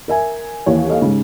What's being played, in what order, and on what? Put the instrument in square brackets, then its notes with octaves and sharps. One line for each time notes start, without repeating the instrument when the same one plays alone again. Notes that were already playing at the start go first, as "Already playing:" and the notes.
[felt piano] A#4 E5 G#5
[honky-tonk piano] D#2 E3 C#5
[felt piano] A4 D#5 F5
G#2 C#3